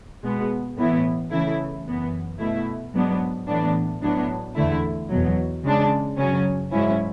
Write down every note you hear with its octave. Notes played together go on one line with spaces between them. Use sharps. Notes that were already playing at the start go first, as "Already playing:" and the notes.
B2 G#3 B3
A2 E3 B3 E4
C#3 E3 A3 E4
F#2 E3 B3
B2 A3 E4
G#2 F#3 B3 D4
A2 E3 B3 D4
A2 F#3 B3 D4
E2 D3 A3 E4
E2 B2 F#3
C#3 G#3 D4
F#2 C#3 F#3 C#4
G#2 F#3 C#4 E4